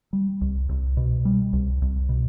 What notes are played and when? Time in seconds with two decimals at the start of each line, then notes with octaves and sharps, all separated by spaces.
0.13 G3
0.41 C2
0.69 C2
0.97 B2
1.25 G3
1.53 C2
1.82 C2
2.09 B2